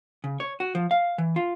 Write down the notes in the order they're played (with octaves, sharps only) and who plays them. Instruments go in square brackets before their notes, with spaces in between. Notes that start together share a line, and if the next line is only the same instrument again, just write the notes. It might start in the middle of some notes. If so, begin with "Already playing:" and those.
[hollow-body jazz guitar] C#3
C#5
F#4
F3
F5
E3
F4